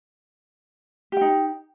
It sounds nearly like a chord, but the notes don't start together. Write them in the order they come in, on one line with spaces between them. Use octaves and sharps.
G4 G5 D#4